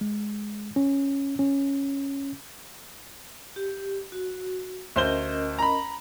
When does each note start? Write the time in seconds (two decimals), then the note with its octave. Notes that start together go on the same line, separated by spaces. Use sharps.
0.01 G#3
0.76 C#4
1.39 C#4
3.56 G4
4.12 F#4
4.96 D2 C#4 A#4 C5 D#5 G7
5.59 A#5 B5